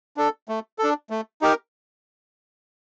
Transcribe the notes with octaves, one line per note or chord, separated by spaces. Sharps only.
D4 A4
A3
D4 A4
A3
D#4 G4 A#4